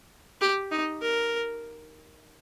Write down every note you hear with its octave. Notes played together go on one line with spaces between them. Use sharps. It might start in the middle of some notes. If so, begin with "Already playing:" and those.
G4
D#4
A#4